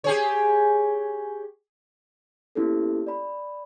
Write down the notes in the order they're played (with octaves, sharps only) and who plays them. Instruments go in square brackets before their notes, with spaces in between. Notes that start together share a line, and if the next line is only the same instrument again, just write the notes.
[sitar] G4 G#4 C#5
[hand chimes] A#3 B3 C#4 E4 G4 A4
D5 B5